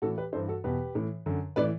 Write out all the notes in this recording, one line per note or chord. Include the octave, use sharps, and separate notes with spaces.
A2 E3 F#4 A4
G4 B4
G2 E3 A4 C5
F#4 A4
E2 B2 G4 B4
A2 E3
F#2 D3
A2 E3 B4 D5